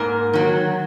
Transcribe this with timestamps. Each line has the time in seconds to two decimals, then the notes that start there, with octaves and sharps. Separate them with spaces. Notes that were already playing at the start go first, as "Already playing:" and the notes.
Already playing: G#2 A#3 A#4
0.33 D#3 F#3